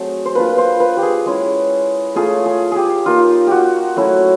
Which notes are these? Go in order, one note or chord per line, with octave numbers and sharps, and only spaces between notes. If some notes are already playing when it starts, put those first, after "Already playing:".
Already playing: F#3 A3 C4 G#4
C5
A#3 D4 F4 B4
C5
B4
G4
G#4
G#3 C#4 E4
A3 C#4 F4 G#4
G#4
G4 G#4
A#3 D#4 F4
F#4 G4
F#3 A3 C#4 E4